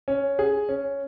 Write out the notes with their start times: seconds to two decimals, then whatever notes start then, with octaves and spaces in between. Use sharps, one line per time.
0.08 C#4
0.39 G#4
0.69 C#4